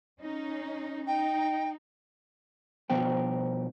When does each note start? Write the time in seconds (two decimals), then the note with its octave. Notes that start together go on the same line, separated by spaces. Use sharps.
0.21 C#4 D#4
1.06 D#4 G5
2.90 B2 F3 B3 C5 G5